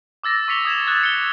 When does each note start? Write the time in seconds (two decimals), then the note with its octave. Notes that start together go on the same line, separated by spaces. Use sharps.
0.24 D6 E6 A6 A#6
0.48 C#6 D6 B6 C#7 F7 G7
0.65 D#6 G#6 E7
0.87 F#6 G#6 A6
1.03 C#7 G7